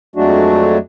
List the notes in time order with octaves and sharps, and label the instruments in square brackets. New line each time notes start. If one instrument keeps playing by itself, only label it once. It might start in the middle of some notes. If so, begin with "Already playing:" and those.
[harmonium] F2 F#3 G#3 A3 D4 F#4